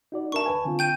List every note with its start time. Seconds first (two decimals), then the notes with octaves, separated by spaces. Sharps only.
0.12 D#4 F#4 D5
0.32 D4 A#4 E5 A5 C#6
0.46 D2 B4 G#5
0.65 D3 C4 F4
0.79 G5 G6 D#7